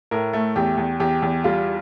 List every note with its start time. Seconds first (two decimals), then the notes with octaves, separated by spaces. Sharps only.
0.11 A2 A#4
0.33 A3
0.56 E2 G4
0.77 E2
1.00 E2 G4
1.22 E2
1.44 G3 F4